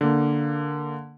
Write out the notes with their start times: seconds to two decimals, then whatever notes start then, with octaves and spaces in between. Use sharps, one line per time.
0.01 D3 A#3